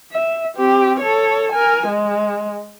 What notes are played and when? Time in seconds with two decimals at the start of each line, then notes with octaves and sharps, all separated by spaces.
0.12 E5
0.57 C4 G4
1.00 A4 C#5
1.52 A#4 G#5
1.88 G#3